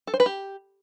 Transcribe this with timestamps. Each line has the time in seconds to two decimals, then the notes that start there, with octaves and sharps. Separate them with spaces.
0.07 A4
0.14 C5
0.20 B4
0.26 G4